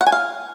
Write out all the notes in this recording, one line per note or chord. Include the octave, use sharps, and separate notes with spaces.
F#5
G#5
F5